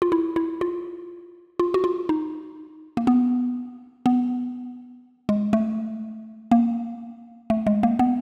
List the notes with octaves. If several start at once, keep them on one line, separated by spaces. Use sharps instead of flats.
F4
E4
E4
F4
F4
F#4
F4
D#4
A#3
B3
B3
G#3
A3
A#3
A3
G#3
A#3
B3